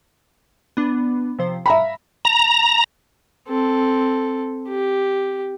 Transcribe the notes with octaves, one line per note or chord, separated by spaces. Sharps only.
B3 D4
C3 F3 C5
E5 F5 A#5 B5
A#5
C4 A4
G4